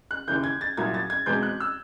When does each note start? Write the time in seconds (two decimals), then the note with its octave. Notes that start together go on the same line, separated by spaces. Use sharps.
0.11 F#6
0.28 D#2 C#3 E3 G6
0.44 G#6
0.61 A6
0.77 C2 A#2 F#3 G#6
0.94 A6
1.10 G#6
1.26 E2 B2 G#3 C4 G6
1.43 F#6
1.60 E6